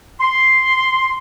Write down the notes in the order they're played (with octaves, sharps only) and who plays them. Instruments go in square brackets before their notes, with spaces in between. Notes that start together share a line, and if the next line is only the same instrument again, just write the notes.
[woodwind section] C6